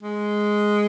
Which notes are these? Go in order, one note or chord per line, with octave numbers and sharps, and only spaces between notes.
G#3